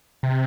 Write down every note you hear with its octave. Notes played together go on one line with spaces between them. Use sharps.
C3